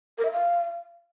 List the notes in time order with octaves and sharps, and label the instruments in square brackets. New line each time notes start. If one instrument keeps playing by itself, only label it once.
[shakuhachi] A#4
E5
F5